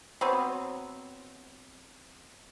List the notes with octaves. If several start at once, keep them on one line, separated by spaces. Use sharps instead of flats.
F#3 B3 C4